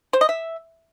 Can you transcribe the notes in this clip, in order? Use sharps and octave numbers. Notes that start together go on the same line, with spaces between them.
C5
D#5
E5